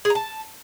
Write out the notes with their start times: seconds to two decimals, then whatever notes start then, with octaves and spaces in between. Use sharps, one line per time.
0.05 G#4
0.10 A#5
0.15 A5